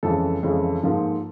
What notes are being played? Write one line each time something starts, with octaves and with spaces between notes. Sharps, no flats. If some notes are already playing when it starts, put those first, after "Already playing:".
F2 C#3 E3 G#3 A4
F2 C#3 E3 G#3
G#2 F3 A#3